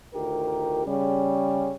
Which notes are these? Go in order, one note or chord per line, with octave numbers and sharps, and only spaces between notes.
D2 D#3 F4 G4 A#4
C#3 G3 C#4